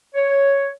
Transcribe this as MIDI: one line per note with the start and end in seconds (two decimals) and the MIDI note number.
0.15 0.69 73